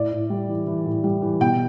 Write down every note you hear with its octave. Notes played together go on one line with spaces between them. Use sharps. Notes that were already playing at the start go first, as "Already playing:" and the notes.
Already playing: A2 D5
A2
G3
E3
E3
A2
G3
E3
B2 G5